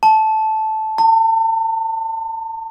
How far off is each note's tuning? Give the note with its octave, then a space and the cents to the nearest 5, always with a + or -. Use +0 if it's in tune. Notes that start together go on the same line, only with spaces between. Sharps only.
A5 -10
A5 +40